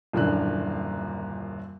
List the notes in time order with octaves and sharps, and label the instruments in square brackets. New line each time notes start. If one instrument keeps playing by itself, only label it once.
[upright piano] D#1 F#2 A#2 D3 E3 F#6